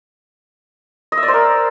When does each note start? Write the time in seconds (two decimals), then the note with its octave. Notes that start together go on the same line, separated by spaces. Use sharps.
1.12 D#5
1.17 E5
1.23 D5
1.28 C5
1.34 A#4